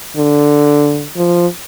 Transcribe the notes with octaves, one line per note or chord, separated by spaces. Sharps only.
D3
F3